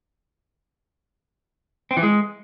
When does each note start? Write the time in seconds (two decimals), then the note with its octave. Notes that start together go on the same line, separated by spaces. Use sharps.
1.91 C4
1.97 E3
2.03 G#3